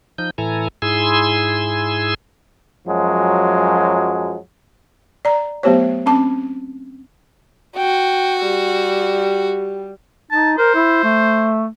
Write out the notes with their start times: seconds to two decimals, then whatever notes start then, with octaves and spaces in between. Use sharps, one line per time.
0.18 F3 D#4 G6
0.38 A2 E3 E4 A4 G#5 A#5
0.82 G#2 E4 G#4 G#5 C6 E6
2.87 F#2 F3 F#3 G#3
5.25 D5 A#5
5.63 F#3 A3 B3 G4 C5 C#5
6.06 C4 C#4 A5 D6
7.77 F#4 G5
8.41 G3
10.31 D#4 A5
10.58 A#4 C5
10.75 E4
11.04 A3